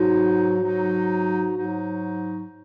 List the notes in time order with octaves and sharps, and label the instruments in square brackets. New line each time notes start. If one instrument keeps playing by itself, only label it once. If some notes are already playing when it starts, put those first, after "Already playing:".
Already playing: [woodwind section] G#2 F#3 D#4 [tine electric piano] F#4
[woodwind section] G#2 F#3 D#4
G#2 F#3 D#4